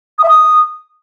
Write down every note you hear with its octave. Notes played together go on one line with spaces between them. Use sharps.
D#6
E5
D#6